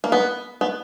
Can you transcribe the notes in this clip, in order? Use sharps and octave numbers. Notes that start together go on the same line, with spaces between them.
A#3
B3
B3